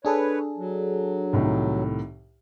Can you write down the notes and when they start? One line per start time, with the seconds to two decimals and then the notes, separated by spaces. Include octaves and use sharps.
0.05 D4 G#4 A4 B4 C#5
0.57 F#3
1.33 C2 A2 D#3